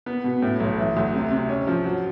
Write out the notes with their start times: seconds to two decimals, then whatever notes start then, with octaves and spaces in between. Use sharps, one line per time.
0.06 B3
0.24 B2
0.42 A2
0.60 B1
0.78 E3
0.96 D2
1.14 C3
1.31 C3
1.49 C#4
1.67 F3
1.85 F#3